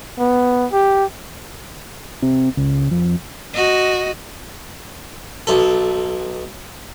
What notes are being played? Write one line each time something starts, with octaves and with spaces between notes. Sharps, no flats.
B3
G4
C3
C#2
F2
F#4 D#5
B1 A4